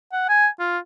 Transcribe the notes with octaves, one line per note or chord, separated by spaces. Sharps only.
F#5
G#5
F4